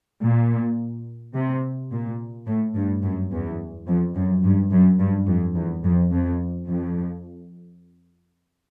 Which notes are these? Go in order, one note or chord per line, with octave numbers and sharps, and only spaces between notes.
A#2
C3
A#2
A2
G2
F#2
E2
F2
F#2
G2
F#2
G2
F2
E2
F2
F2
F2